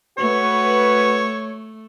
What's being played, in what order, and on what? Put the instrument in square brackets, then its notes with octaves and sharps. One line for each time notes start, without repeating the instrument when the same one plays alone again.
[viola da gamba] A3 [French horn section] F#4 B4 [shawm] C#5